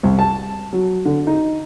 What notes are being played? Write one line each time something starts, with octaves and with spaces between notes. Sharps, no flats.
C2
A5
F#3
D3
D#4